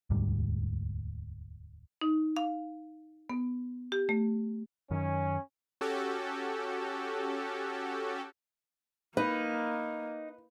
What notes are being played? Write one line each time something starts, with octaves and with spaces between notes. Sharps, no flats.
E1 D2 G#2 G3
D#4
F5
B3
G4
A3
F#2 D#3 C#4
C#4 F#4 G4 A4
A#3 D#4 B4